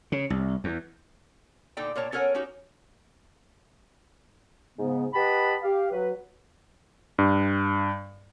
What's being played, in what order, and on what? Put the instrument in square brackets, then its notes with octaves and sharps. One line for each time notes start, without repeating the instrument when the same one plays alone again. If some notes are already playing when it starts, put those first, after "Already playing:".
[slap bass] C#3
C2
E2
[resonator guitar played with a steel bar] A#2 D3 D#4 A4 D5 G5
A#2 A#4 C#5 A5
C#4 A4 A#4 C#5 F#5 G#5
C#4 D#4 F#4 G4
[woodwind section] G#2 C#3 B3
G4 B4 D#5 F#5 A5 B5
G4 F5
F#3 B4
[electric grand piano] G2